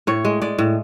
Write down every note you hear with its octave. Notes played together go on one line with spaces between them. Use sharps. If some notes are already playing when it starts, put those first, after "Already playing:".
A2 C#5
G#3
G#3 D5
A2